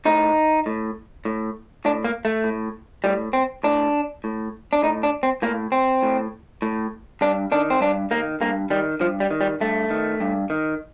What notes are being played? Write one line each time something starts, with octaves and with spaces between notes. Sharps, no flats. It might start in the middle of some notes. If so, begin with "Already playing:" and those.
A2 D#4
A2
A2
A2 D4
A#3
A3
A2
A2 G3
C4
A2 D4
A2
D4
A2 D#4
D4
C4
A2 A#3
C4
A2
A2
G2 D4
D#3 D4
C4
G2 D4
D#3 A#3
G2 A#3
D#3 G3
G2 F3
G3
D#3
G3
G2 A3
D#3
G2
D#3